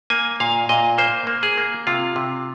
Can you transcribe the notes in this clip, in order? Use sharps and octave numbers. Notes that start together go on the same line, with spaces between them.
A#3 G#5
A#2 F5
A#2 D#5
A#3 C5
A#3
G#4
A#3
C3 F4
C3